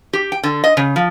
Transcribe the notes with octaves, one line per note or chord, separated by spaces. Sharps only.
G4
G5
D3
D#5
C#3
F3